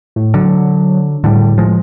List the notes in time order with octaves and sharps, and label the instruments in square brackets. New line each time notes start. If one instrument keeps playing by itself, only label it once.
[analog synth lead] A2
[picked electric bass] D3 [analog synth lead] F#3
[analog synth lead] A2 [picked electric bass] D3 G3
[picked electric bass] F3 G#3